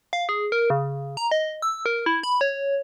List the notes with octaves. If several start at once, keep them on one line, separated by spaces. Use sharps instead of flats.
F5
G#4
A#4
C#3
A#5
D#5
E6
A#4
E4
B5
C#5